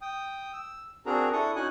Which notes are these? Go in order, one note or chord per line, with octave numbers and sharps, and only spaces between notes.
G5 D#6
E6
C4 D4 F#4 G#4 A#4 A#5
D4 E4 A4 C#6 D#6
C#4 D#4 F#4 F#5 G#5 F#6